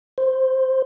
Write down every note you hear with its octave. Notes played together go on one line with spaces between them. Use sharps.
C5